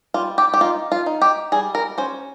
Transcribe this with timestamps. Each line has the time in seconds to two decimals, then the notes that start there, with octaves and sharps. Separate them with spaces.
0.14 G3 F4
0.38 G4
0.54 G4
0.61 D#4 F4
0.92 F4
1.06 D#4
1.21 G4
1.52 G3 G#4
1.75 A#4
1.98 C#4 C5